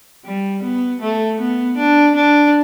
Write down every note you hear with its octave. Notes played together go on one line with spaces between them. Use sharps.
G3
B3
A3
B3
D4
D4